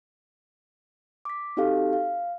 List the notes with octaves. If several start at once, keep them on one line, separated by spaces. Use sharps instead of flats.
D6 B6
C4 D#4 F#4 G4 A4 F5
F5